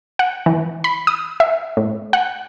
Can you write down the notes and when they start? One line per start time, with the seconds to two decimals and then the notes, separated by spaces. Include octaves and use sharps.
0.19 F#5
0.46 E3
0.84 B5
1.07 D#6
1.40 E5
1.77 A2
2.13 F#5